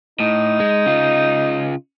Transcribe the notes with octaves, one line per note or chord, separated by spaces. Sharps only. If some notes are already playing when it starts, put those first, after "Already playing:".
A2 D#4
G#3
C#3 F4